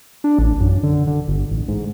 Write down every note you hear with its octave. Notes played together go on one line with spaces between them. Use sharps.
D4
A1
F#2
D3
D3
G1
A1
G#2